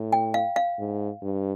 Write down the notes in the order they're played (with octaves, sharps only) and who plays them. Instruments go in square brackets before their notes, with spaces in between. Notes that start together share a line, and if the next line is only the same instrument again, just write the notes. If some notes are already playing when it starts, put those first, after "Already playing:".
Already playing: [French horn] A2
[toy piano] G5
F5
F5
[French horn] G#2
G2